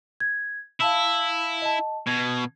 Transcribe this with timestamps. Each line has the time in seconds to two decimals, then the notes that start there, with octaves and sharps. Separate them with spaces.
0.20 G#6
0.80 E4 F5 A5 E6
1.62 D#5 A5
2.07 B2 G#6